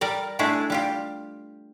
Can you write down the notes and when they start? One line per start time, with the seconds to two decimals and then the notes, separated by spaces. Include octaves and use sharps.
0.01 G3 A#4 D5
0.39 G#3 A3 D4 E4 G#4
0.70 G3 F4 G4